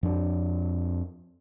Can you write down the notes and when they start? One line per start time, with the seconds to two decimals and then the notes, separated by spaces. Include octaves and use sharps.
0.03 F2 D4